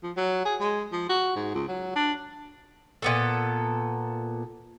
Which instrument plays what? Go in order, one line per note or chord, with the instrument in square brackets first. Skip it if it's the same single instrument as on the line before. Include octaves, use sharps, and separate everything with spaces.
[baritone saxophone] F3
F#3
G#4
G#3
F3
F#4
G#2
C#2
F#3
D4
[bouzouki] A#2 B3 A4